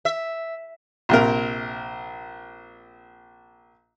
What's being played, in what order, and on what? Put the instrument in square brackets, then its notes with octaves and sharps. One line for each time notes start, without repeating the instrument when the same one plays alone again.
[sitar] E5
[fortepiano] A#1 C3 A#4